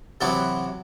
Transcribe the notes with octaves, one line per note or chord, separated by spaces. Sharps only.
C3 E3 F#3 B3 E4 F#4